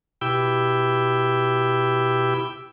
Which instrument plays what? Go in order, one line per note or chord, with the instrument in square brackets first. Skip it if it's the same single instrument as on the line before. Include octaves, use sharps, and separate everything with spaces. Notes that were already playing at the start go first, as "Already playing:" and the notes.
[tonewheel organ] B2 E4 G4 G5 E6